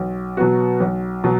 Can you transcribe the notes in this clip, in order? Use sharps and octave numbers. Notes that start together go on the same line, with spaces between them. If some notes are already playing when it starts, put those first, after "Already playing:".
Already playing: B1
B2 F#3 B3 F#4
B1
B2 F#3